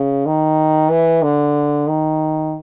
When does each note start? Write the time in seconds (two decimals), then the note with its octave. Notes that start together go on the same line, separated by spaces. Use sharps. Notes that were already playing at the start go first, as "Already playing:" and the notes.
Already playing: C#3
0.26 D#3
0.91 E3
1.23 D3
1.88 D#3